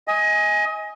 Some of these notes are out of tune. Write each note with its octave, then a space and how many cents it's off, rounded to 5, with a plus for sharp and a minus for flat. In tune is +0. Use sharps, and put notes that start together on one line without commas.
D#5 +25 G#5 +0